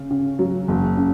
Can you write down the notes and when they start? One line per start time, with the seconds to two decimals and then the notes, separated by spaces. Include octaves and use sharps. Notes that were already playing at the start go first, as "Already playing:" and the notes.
Already playing: C#3
0.10 C#3
0.39 F#3
0.68 F#1
0.97 C#3